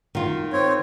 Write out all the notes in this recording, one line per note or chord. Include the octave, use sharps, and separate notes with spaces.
D#3 F4
C4 C#5